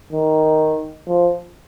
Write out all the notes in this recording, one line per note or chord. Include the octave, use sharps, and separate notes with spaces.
D#3
F3